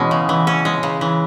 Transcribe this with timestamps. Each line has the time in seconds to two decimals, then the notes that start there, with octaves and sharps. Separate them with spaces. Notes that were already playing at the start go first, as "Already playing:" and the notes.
Already playing: B2 E3 G#3 C#4
0.11 C#3
0.29 E3
0.47 C#4
0.65 G#3
0.83 C#3
1.01 E3